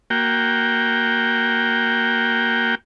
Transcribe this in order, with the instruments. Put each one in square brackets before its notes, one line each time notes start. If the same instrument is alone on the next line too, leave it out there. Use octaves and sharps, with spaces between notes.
[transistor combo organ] A#3 F#4 G5